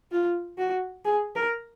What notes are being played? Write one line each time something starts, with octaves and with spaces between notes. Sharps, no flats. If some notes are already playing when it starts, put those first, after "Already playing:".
F4
F#4
G#4
A#4